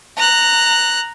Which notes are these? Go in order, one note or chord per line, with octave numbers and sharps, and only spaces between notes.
A#5 F#6